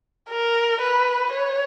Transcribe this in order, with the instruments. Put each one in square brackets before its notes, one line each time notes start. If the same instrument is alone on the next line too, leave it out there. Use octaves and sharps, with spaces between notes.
[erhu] A#4
B4
C#5